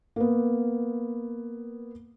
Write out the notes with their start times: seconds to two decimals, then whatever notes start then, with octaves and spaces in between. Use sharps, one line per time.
0.16 A#3 B3